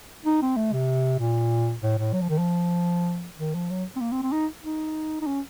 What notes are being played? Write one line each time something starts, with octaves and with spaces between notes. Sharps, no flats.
D#4
C4
A3
C3
A#2
A2
A2
F#3
F3
D#3
F3
D#3
F3
F#3
C4
A#3
C4
C4
D#4
D#4
D#4
C#4